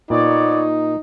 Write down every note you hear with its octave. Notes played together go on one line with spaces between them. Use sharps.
A#2 B3 D#4 C#5 D5